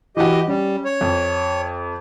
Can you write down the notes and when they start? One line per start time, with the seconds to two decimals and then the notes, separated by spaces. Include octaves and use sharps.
0.17 E3 F#4 G4 D#5
0.47 G3 C#4
0.85 C#5
1.01 F2